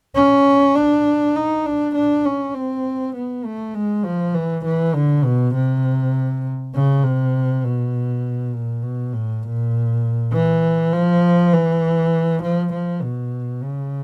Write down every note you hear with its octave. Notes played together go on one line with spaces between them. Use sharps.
C#4
D4
D#4
D4
D4
C#4
C4
B3
A3
G#3
F3
E3
E3
D3
B2
C3
C#3
C3
B2
A#2
B2
A2
A#2
E3
F3
E3
F3
F3
B2
C#3